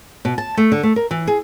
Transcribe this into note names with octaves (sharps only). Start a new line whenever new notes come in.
B2
A5
A3
D3
A3
A#4
E3
G#4